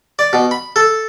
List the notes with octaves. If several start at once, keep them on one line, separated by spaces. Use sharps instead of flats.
D5
B2
B5
A4